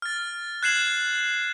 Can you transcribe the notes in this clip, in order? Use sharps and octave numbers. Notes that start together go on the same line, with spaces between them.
F6 A6
F#6 G#6 C7 E7 F#7